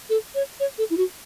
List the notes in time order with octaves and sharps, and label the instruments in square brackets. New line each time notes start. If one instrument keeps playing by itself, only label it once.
[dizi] A4
C#5
C#5
A4
E4
F#4